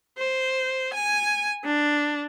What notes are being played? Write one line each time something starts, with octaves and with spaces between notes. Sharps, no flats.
C5
G#5
D4